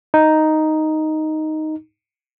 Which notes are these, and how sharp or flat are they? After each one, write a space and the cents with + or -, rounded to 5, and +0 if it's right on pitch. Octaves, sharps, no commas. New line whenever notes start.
D#4 +0